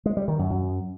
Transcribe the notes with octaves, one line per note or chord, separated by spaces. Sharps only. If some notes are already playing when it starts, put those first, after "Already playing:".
G#3
G3
D#3
F#2
F#2